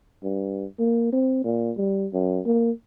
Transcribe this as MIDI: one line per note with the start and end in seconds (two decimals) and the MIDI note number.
0.23 0.65 43
0.79 1.07 58
1.12 1.40 60
1.44 1.71 46
1.77 2.07 55
2.13 2.40 42
2.46 2.71 58